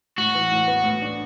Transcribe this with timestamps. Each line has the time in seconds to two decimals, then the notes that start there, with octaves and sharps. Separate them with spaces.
0.18 A2 F#4
0.35 E3
0.52 A2
0.68 B3
0.84 A2
1.02 D4